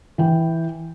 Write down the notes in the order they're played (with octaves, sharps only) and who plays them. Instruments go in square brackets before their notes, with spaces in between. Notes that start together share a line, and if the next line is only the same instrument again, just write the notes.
[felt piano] E3 G5